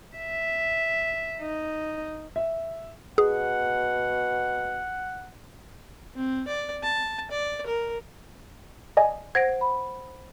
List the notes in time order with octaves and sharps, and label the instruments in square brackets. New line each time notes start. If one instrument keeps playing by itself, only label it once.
[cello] E5
D#4
[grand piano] E5
[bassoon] B2 [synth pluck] G#4 [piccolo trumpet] F#5
[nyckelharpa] C4
D5
A5
D5
A#4
[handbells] D5 D#5 G#5
[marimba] C5 F#5 [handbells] G#6 A#6 D7
[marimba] B5